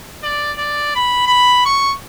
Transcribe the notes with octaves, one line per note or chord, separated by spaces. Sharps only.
D5
D5
B5
B5
C#6